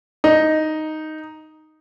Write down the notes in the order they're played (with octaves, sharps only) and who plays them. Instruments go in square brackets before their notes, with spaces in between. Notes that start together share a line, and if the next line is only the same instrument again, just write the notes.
[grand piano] D#4